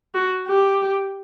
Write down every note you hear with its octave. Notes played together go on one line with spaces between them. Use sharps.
F#4
G4